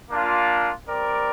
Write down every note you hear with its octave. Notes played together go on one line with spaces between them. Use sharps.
A#3 D4 F4
G3 C4 A#4 D5